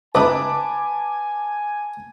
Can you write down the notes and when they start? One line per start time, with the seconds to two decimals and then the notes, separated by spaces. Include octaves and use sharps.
0.15 C#2 D#4 E4 B4 G#5 A5 D6